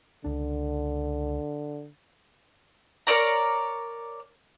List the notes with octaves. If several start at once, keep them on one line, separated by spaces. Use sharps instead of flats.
C#2 D3 D4
A#4 C#5 D5 A#5